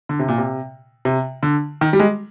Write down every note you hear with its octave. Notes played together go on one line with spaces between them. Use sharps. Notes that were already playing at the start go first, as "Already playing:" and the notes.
D3
C3
A#2
C3
C3
D3
D#3
G3
G#3